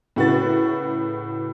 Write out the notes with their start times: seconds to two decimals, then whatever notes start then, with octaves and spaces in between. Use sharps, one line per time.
0.16 A2 C#3 F#4 A#4 B4 A6